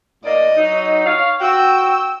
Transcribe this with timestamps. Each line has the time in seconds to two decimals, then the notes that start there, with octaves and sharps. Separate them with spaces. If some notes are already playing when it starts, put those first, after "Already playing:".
0.24 A2 A#3 D5 D#5
0.56 F#3 D#4
1.06 C#5 F5
1.40 F#4 G5 E6